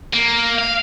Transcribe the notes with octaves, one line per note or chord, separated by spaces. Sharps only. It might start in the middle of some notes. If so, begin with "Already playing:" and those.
A#3
F5